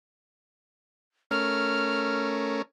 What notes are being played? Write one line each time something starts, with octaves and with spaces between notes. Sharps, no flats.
A3 C#4 A#4 F6